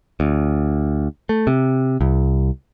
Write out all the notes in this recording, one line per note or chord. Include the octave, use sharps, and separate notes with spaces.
D2
A3
C3
C2